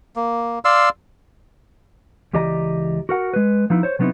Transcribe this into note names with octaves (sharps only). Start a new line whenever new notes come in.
A#3
D5 F5 C6 E6
C#2 E3 G4 D5 D#5 A#5
F#4 A#4 F#5
G#3 B4
F3 B3 D#4 E4
C5 C#5
C3 F#3 B3 C4 D#4 E4